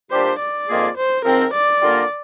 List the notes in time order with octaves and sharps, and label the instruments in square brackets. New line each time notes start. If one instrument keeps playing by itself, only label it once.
[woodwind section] A#2 G3 D4 G4 [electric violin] C5
[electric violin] D5
[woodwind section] F2 D#3 A#3 F4 G#4
[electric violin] C5
[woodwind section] G#2 F3 C4 [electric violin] A#4
[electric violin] D5
[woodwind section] D3 G3 A#3 F4 A#4